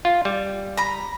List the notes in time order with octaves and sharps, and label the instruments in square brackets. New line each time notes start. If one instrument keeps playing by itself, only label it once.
[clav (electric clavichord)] F4
G3
[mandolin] A#5 B5